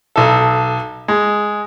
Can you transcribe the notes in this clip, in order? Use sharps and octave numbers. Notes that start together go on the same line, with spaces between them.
B1 A4
G#3